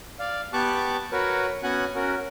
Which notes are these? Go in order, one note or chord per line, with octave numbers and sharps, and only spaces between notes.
D5 F5
B3 G4 A5 C#6 D6 F#6
F#4 A#4 B4 C#5
B3 C#4 F#4 F#5 G#5 F#6
C#4 F#4 A#4